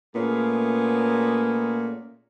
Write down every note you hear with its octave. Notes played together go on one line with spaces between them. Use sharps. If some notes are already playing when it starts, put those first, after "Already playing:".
A#2 A3 B3 C#4 G#4